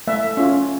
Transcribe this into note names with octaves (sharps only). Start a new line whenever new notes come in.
A3 E5
C#4 F4